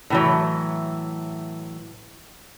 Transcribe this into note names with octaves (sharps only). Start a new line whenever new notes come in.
A2 E3 F#3